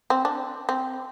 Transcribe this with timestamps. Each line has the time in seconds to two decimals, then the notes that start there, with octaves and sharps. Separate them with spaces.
0.10 C4
0.25 D4
0.69 C4